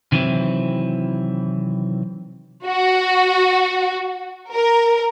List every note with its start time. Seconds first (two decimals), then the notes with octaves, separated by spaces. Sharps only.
0.12 C3 D#3 E3 F#3 C4 E4
2.65 F#4
4.52 A#4